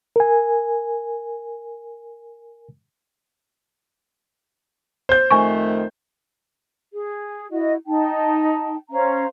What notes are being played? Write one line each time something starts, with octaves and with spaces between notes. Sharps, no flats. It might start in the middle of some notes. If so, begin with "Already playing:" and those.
A#4 G#5
C5 G6
F2 D#3 A3 G#5 C#6
G#4
E4 F#4 D#5
D#4 G5 A5
C#4 C5 F5 A#5